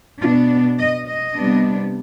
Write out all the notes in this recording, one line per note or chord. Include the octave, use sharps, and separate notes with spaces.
B2 B3 D4 F4
D#5
D#5
C3 G3 B3 D4